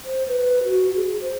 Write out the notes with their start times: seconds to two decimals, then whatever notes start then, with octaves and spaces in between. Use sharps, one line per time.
0.05 C5
0.28 B4
0.64 F#4
0.96 G#4
1.22 C5